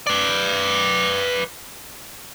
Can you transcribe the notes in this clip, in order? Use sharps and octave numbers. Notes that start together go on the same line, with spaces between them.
B4 D5